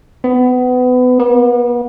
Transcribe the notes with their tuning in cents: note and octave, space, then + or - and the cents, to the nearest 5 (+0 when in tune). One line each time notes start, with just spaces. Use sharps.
B3 +25
B3 -40